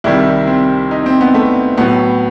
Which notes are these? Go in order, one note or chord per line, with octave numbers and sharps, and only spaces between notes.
C2 C3 D#3 G3 E4
C4
D#4
C4
B3
A3
A2 F#3 B3